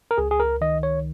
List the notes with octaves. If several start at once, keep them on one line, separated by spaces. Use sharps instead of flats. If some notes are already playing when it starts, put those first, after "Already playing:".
A#4
C#2 G#4
G#4
A#4
D#3 D#5
C#5